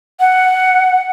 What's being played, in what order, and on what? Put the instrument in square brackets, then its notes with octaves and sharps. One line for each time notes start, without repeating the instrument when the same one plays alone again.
[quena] F#5